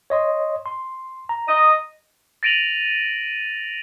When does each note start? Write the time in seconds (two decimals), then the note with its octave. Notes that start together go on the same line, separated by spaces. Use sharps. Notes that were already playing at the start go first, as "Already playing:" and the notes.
0.10 C#5 D#5 C6
0.66 C6
1.29 A#5
1.48 D#5
2.43 A6 A#6 D7 D#7 F7 F#7